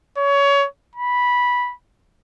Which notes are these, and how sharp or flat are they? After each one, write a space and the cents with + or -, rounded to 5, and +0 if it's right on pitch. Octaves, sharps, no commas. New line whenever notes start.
C#5 +20
B5 -10